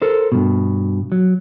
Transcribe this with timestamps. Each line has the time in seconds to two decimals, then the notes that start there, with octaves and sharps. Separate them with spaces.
0.02 A4 A#4 C5
0.32 G2 B2
1.12 F#3